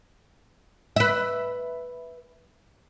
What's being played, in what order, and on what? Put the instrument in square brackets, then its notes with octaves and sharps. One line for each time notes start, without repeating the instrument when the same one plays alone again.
[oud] B4 E5